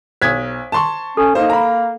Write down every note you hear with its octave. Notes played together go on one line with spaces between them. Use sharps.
B1 C5 D#6 G#6 B6
A5 C6 C#6
C#4 A4
A#3 D#4 C5
A#5 B5